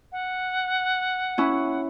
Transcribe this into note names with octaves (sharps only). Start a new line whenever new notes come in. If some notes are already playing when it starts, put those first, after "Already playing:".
F#5
C#4 E4